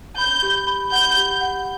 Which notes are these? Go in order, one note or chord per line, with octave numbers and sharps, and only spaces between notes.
B5 G6
G4
B5
F#5 G6
G4
F#5